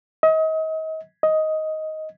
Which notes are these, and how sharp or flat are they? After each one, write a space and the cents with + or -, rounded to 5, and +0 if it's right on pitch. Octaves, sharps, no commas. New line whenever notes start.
D#5 +35
D#5 +10